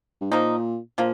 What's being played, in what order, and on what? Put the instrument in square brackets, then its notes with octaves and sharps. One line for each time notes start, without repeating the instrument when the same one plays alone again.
[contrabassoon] G2
[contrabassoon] A#2 [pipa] F3 A#3 D#4
[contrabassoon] A#2 [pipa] F3 A#3